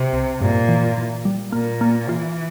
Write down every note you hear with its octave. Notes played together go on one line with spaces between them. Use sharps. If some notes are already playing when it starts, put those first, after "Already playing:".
Already playing: C3
C2
G2 A#2
E3
E3
G3
A#2 A#3
A#3
E3 F4